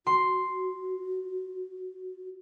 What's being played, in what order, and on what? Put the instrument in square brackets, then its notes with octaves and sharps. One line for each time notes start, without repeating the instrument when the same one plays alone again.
[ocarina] F#4 [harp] C6